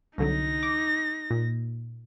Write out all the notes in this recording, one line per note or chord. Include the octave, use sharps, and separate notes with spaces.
C2 D3 F#3 D#4 A#6
D6
A#2